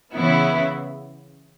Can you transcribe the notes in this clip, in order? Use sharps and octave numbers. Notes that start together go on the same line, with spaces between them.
C#3 E3 B3 E4